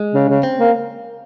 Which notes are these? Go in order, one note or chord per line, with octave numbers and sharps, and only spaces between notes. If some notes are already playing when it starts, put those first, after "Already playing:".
Already playing: G#3
C#3
C#3
C4
A#3